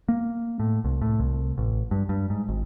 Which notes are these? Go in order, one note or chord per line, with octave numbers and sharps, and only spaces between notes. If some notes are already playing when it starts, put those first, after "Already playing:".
A#3
A2
C2
A2
C2
A1
G2
G2
G#2
G#1